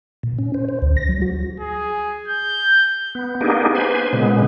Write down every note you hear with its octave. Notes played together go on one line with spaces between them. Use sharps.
A#2
C#4
C5
C5
D2
A#6
F#3
F#4
G#4
G6
B3
A#3 B3 D4 D#4 G4 G#4
B4 C5 G#5
A#2 C#3 G#3 B3